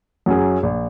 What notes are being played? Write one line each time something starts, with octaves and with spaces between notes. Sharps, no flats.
F#2 F#3 C#4 G#4
A#1